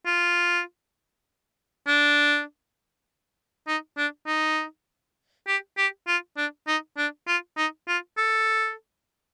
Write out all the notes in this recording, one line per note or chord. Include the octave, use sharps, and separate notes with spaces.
F4
D4
D#4
D4
D#4
G4
G4
F4
D4
D#4
D4
F4
D#4
F4
A4